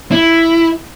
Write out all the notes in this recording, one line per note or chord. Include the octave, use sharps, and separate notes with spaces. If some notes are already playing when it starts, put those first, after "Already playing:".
E4